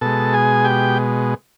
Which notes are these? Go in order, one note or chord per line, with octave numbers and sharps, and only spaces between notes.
B2 G#3 A4 A5
G#4 G#5
G4 G5